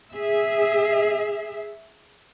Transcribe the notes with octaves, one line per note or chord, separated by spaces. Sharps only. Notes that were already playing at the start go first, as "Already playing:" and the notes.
G#4 E5